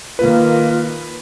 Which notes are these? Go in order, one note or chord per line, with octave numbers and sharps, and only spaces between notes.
D#3 A#3 F4 B4